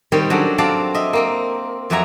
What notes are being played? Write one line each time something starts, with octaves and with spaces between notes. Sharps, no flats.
D#3 G3 C4 C#5
F#3 C#4 D4 A4
F#3 C4 D5 F5 A5
D#5 E5
A#3 C4 A#4
F2 F#3 D5 E5 G#5 A#5